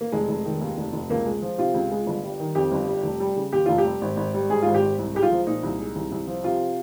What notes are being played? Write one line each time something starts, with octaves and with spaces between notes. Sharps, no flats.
A#3
F1 G#3
F1
D#3
D#2
F1
F1
C#2 A#3
G#3
F3
C3 F4
C#2
G#3
G1
G3
D#3
F2 G4
G1
G3
F1
G3
C#3
D#2 G4
F1 F4
G4
G3
G#1
G#1
G3
G#2 G#4
G#1 F4
G4
G#1
C2
G#3 G4
F4
F3
A#2 D#4
C2
G#3
C2
C2
F3
C3 F4